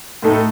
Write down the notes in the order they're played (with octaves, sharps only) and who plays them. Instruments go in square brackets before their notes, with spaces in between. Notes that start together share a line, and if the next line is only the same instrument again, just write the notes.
[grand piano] A2 A3 D#4 A4